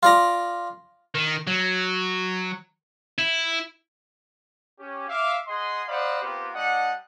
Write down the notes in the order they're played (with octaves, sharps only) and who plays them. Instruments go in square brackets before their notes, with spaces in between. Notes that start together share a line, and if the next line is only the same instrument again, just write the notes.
[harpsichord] F4 D5 A#5
[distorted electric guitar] D#3
F#3
E4
[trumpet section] C#4 G4
E5 F5 D6
G#4 D#5 F#5 C6
C5 D5 D#5 F5 F#5 B5
B3 C4 F4 G4 A#4 B4
G3 D4 D#5 F#5